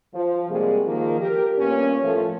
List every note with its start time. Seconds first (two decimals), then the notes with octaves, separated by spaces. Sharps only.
0.13 F3
0.49 C3 G3 G#3 A#3 F#4 G#4
0.86 D#3 F3 A#3
1.19 G4 A#4
1.58 G2 A#2 A#3 B3 C#4
2.03 A2 F3 A3